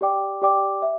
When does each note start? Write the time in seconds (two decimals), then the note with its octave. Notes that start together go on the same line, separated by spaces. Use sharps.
0.01 G4 D5 G5 D6
0.42 G4 D5 G5 D6
0.82 E5